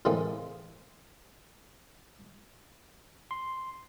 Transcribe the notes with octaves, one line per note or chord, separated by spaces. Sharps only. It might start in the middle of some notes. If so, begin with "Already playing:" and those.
A2 C3 E3 G#3 A#3
C6